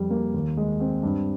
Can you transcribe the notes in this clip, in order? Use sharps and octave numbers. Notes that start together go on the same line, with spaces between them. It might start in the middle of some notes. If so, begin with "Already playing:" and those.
Already playing: F2 G3
A#3
D#2
G#3
C4
G2